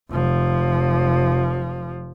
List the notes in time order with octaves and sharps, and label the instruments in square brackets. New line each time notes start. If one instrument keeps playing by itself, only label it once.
[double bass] F1 F3